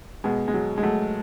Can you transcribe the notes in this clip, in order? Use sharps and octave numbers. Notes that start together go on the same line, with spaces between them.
B2 G#3
G#3
F#3
G#3
F#3 A3